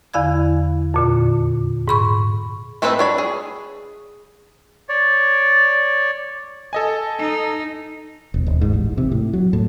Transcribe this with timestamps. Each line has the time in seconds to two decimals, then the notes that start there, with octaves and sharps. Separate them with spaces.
0.14 E2 D3 E4 F5 B5 G#6
0.94 F2 A#2 D3
1.88 G#2 B5 C#6
2.82 A3 C4 D#4 E4 B4
2.99 D4 C#5 B5
3.18 G#4
4.89 C#5 D5
6.73 A4 D#5 G#5
7.19 D#4
8.34 E1
8.47 D#1
8.61 G#2
8.73 A1
8.98 C3
9.12 A2
9.33 F#3
9.53 A2